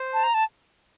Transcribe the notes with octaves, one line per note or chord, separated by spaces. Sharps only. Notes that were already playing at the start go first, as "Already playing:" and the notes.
Already playing: C5
A5
A#5
A5